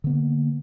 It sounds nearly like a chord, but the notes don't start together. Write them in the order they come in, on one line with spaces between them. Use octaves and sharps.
D3 B3 A#3